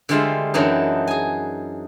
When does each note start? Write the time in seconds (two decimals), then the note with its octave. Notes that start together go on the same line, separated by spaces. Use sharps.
0.09 D3 G3 G#3 F4 C5 E5
0.54 F#2 E3 F#3 D4 D#4
1.07 G#4 G#5